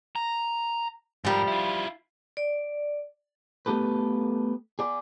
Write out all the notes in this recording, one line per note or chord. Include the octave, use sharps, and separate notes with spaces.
A#5
G#2 F3 G3 A#4
E4 F4
D5
A3 B3 G4 A4 B4
G#4 D5